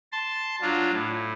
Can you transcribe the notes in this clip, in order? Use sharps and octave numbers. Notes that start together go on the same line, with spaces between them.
A5 C6
F#3 D4 F4
A2